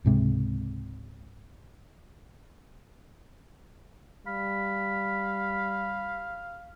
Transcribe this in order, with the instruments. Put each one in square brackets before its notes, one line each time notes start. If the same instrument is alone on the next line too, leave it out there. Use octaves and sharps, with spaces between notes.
[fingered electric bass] C#2 G#2 C3 G#3
[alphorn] G3 [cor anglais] F5 [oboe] B5